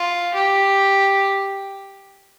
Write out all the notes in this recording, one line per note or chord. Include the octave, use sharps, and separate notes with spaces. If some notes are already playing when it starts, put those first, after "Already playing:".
Already playing: F4
G4